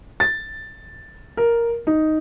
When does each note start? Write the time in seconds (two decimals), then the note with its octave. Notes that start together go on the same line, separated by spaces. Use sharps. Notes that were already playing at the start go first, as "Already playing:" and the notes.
0.20 A6
1.37 A#4
1.87 D#4